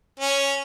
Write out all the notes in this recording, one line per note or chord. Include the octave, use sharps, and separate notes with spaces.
C#4